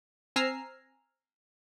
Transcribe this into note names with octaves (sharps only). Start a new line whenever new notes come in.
C4 G#5 A#5 E6 F6 C7